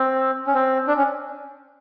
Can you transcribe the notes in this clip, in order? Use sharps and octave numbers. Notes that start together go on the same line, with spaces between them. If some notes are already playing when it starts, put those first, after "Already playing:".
Already playing: C4
C#4
C4
D4
C#4